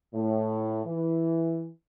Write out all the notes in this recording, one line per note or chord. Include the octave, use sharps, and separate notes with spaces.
A2
E3